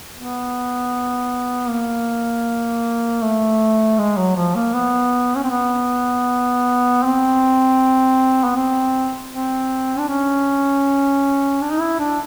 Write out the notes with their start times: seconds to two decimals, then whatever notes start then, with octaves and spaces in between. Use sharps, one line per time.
0.17 B3
1.69 A#3
3.22 A3
3.98 G#3
4.18 F#3
4.37 F3
4.55 A#3
4.74 B3
5.36 C#4
5.43 C4
5.51 B3
7.04 C4
8.44 B3
8.56 C4
9.32 C4
9.99 D4
10.09 C#4
11.61 D4
11.72 D#4
11.80 E4
12.00 D4